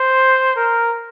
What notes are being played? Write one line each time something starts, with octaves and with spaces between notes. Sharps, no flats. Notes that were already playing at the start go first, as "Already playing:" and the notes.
Already playing: C5
A#4